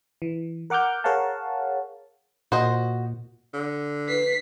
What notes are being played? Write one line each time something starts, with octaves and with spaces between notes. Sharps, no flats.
E3
A#4 F#5 D6 F6 G6
G#4 A#4 C#5 F5 F#5 A5
A#2 F#4 C5 D#5
D3
B4 B6 C7